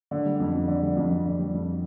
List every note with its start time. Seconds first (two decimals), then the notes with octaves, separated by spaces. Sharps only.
0.11 D3
0.25 G3
0.40 F2
0.55 F2
0.68 D3
0.82 G3
0.96 F2
1.10 F2
1.25 D3
1.39 G3
1.53 F2